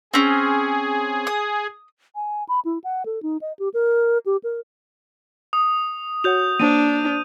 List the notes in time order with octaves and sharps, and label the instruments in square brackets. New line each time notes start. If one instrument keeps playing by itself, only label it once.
[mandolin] C4 C#4 [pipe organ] G#4
[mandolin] D#6
[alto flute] G#5
B5
E4
F#5
A4
D#4
D#5
G4
A#4
G4
A#4
[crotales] D#6
[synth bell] F#4 C#5 F#5 [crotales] G6 F7
[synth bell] A#3 C5 [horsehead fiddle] D4 [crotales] D#7